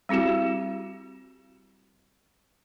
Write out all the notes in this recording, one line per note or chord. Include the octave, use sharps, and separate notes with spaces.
G3 C4 E4 F#4 G4